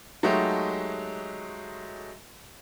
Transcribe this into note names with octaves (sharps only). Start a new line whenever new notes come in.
F#3 G#3 A3 D#4 F#4 G4